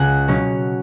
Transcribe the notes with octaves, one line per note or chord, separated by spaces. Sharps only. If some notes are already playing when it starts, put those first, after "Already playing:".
Already playing: C#2 F#5 G#5
B2 F#3 C#4